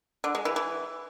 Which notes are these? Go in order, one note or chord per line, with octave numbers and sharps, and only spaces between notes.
D3
G#3
E3
E3